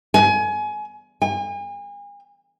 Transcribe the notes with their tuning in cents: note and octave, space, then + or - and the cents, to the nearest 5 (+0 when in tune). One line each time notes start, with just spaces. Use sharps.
G#5 +25
G#5 -40